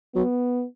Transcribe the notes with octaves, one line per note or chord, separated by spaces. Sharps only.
F#3 B3